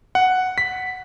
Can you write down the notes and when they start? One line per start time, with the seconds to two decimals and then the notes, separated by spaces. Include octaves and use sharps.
0.15 F#5
0.58 B6